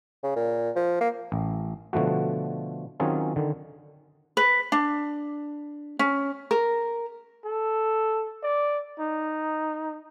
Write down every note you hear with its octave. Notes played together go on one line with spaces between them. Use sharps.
C#3
A#2
F3
A#3
A1
B2 D3 F3 A3 F#4
D#3 F#3 C4 C#4 F4 G#4
D3 D#3
B4
D4
C#4
A#4
A4
D5
D#4